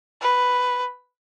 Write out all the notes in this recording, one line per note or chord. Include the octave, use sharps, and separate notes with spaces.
B4